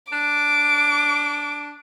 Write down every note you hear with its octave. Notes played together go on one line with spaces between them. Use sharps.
D4 D6